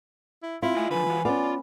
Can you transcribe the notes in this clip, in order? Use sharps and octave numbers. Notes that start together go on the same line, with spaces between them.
E4
C4 E4 F4
A3 D#5 G5 G#5
D3 F3 B4 G#5
E3 F#4
B3 C#4 F4 D5